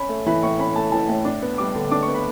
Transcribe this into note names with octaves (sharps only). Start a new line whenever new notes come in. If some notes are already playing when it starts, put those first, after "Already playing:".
Already playing: C#4 B5
A3
E3 B5
A2 C#6
C#4 B5
A3 A5
E3 A5
A2
D4
B3
G3 D6
D3
D4 D6
C#6
B3
B5